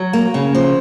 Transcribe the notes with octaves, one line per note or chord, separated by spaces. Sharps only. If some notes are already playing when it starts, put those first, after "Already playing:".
Already playing: F#3
A#3
C#3
F3